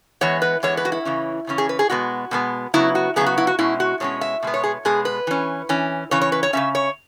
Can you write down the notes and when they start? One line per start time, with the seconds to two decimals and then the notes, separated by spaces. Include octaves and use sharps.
0.21 E3 G#3 B3 C#5
0.42 B4
0.63 E3 G#3 B3 C#5
0.77 B4
0.85 F#4
0.92 E4
1.05 C#3 E3 C#4
1.47 C#3 E3 C#4
1.58 G#4
1.69 B4
1.79 G#4
1.90 B2 G#3 B3 F#4
2.31 B2 G#3 B3
2.74 C#3 F#3 B3 E4
2.95 F#4
3.16 C#3 F#3 B3 G#4
3.26 F#4
3.38 E4
3.47 F#4
3.59 B2 G#3 C#4 E4
3.80 F#4
4.00 B2 G#3 C#4 C#5
4.21 E5
4.43 B2 G#3 B3
4.54 C#5
4.64 G#4
4.85 B2 G#3 B3 G#4
5.05 B4
5.27 E3 C#4
5.69 E3 C#4
6.11 C#3 E3 C#4 C#5
6.22 C#5
6.32 B4
6.43 C#5
6.53 C#3 E3 C#4 E5
6.75 C#5